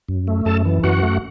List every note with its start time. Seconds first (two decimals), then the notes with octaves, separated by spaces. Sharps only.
0.09 F#2
0.28 A3
0.45 F#2 A4 A5
0.65 E3
0.84 F#2 F#4 F#5
1.03 A3